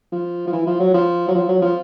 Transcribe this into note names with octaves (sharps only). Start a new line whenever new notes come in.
F3
F3
E3
F3
F#3
F3
F#3
F3
F#3
F3